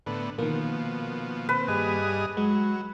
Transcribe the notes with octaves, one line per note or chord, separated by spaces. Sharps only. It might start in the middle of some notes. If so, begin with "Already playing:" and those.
A2 D3 B3
B2 D#3 F3 A#3
C4 B4
G2 G#4 D#5
F#3 G#3